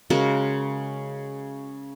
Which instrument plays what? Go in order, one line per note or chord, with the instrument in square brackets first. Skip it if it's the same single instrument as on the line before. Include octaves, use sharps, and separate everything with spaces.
[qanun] C#3 G#3 F#4 A#4